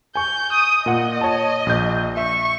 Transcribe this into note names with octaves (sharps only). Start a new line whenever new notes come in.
G#5 C#6 G6
D#6
A#2 D#5 F#5
C#5 A5
A#1 G6
E5 C#6